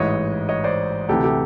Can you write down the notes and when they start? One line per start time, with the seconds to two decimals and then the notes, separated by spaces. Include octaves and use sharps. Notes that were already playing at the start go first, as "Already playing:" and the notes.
Already playing: A1 G#2 E3 C#5 D#5
0.49 C#5 D#5
0.64 C5 D5
1.09 D2 C3 E3 G4 A4
1.24 G4 A4